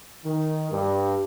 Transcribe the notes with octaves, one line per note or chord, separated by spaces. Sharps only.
D#3
G2